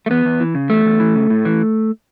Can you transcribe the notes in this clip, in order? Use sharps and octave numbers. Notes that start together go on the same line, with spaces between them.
A3
E2 B3
E2
E3
C#3
E2 A3
E2
E3
C#3
A2
E3